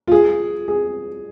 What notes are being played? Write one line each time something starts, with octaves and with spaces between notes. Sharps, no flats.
F4
G#4
G#4